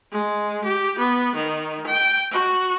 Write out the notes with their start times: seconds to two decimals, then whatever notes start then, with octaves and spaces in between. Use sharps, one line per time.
0.11 G#3
0.64 G4
0.99 B3
1.35 D#3
1.86 G5
2.31 F#4